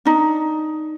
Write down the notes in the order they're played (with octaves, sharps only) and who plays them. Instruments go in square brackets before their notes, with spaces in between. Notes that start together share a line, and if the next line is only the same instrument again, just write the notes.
[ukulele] D4 D#4